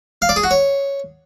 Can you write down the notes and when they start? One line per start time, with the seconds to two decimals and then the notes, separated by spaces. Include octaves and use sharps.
0.22 F5
0.29 D5
0.36 G#4
0.44 F#4
0.51 C#5